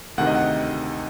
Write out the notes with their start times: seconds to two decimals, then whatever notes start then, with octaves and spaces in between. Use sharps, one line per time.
0.18 D2 C3 D#3 F#5
0.27 D#5
0.35 F#5